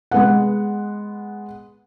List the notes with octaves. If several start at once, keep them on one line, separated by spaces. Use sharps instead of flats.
G#3 B3 F#5